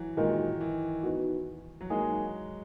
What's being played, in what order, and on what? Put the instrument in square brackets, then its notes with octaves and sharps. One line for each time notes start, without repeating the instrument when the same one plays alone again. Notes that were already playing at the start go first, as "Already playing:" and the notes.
Already playing: [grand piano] E3 F#3
[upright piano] A#2 G#3 D#4 F#4 A#4 [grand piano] D#3
[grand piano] E3
[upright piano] B3 D#4 F#4
[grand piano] F#3
[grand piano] G#3 [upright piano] A#3 D#4 G#4 D#5